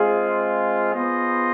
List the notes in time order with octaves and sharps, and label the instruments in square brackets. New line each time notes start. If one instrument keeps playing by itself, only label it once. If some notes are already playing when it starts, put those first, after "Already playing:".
Already playing: [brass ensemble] G#3 C4 F4 [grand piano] G#4
[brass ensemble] B3 F4 C5 D#5